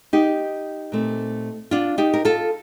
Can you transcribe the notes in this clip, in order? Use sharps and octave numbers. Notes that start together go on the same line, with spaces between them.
D#4 G4
A#2 A3 C4
D4 F4
D#4 G4
A#4
F4 A4